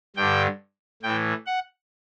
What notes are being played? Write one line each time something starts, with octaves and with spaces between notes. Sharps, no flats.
G2 D3 G5
A2 E3 G5
F#5